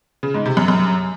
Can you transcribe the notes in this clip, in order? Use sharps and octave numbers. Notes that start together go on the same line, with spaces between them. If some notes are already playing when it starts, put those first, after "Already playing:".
C#3
G#2
C3
F#2
F#2